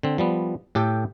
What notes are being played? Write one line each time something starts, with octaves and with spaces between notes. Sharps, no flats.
D3 C4
F3 G3 B3
A2 G4 A4 G5